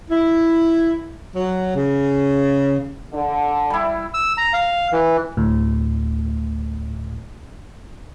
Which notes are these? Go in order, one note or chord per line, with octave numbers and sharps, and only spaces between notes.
E4
F#3
C#3
D3
G3 E4
E6
A#5
F5
E3
D2 A2